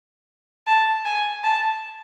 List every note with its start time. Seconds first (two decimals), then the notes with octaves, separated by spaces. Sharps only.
0.67 A5
1.06 G#5
1.44 A5